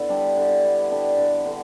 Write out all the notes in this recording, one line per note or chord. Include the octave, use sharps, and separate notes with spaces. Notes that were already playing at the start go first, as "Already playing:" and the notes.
Already playing: D3 B3 E4
G3 D4 G4
D3 G4
E4
B3
D3 D4 G4
D3
D3